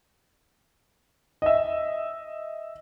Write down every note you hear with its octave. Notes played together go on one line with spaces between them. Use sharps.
D#5 E5